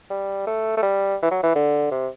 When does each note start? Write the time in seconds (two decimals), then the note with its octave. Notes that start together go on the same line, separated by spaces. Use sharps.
0.10 G3
0.47 A3
0.77 A3
0.83 G3
1.22 E3
1.31 F#3
1.43 E3
1.55 D3
1.92 C3